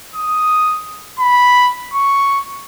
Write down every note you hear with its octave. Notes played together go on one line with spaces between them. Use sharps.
D#6
B5
C#6